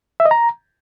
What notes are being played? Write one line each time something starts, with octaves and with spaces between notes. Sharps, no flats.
E5
D#5
A#5